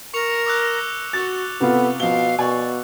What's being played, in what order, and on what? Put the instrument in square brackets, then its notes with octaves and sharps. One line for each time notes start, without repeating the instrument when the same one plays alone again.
[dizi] A#4 [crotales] C#6 C#7 F7
[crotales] D6 E6 F#6
[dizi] F#4 [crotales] F#6 [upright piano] A6
[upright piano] C3 F4 [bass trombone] B3 [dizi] A4
[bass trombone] B2 [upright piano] F3 G7 [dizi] F5
[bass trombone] B2 [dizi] D5 [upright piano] G#5 C#6